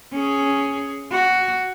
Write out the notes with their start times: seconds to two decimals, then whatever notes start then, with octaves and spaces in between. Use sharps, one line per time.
0.14 C#4 G#4
1.11 F#4